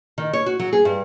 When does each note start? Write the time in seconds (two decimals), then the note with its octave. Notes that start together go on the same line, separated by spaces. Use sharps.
0.18 D#3
0.33 C#5
0.46 F#4
0.59 F#3
0.73 G#4
0.85 G2